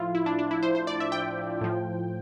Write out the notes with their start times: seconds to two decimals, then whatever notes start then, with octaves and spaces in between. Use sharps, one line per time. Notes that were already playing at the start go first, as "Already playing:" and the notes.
Already playing: A2 F3 E4 F4
0.15 E4
0.26 D4
0.39 D4
0.51 E4
0.63 C5
0.75 C5
0.87 D5
1.00 E5
1.12 G5
1.61 A2 F3